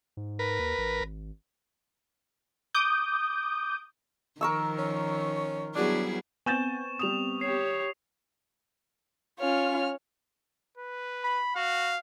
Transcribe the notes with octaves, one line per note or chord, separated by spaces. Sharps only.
G#2
A#4 B4
D#2
A1
G#1
D6 D#6 G6
D#3 F3 A#4 C#6 E6
C#4
F#3 G3 B3 D4 E4 G#4
B3 C4 G#5 C#6 G6 A6 E7
G3 D#6 E7 F7
G4 C#5 C7
C#4 F4 C#5 F6
B4
B5
F#4 F5